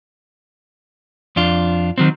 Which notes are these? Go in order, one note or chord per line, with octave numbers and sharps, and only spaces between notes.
F2 D4 F4
D#3 F#3 C4